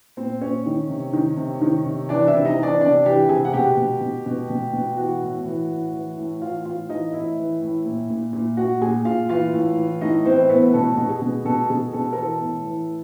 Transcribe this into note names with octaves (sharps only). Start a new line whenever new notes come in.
A#2 C4 C5
A#2 C#4 C#5
D#3
C3
D#3
C3
D#3
C3
E3 D4 D5
E4 E5
C3
D#4 D#5
E3
D4 D5
C3 D4 D5
E3 G4 G5
C3 G#4 G#5
F#5
B2 G4 G5
B2
B2
B2
B2
B2
E3 F#4 F#5
A2
E3
A2
E3
A2
E3 F4 F5
A2 F4 F5
E3 D#4 D#5
A2 E4 E5
E3
A2
A#2
A#2
A#2
A#2 F#4 F#5
A#2 G#4 G#5
A#2 F4 F5
E3 F4 F5
A2
E3
A2 D#4 D#5
E3 C4 C5
A2 B3 B4
B2 A4
B2
G#4
B2
B2 A4
B2 G#4
B2 A4
A#4
E3 A4
A2
E3